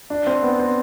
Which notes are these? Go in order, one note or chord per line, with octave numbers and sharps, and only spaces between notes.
D4
C4
B3
C4